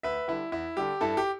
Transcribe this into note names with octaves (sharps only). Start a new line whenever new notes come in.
D2 B4 E5
D3 G3 E4
E2 E4
D3 G3 G4
G2 E4 A4
G4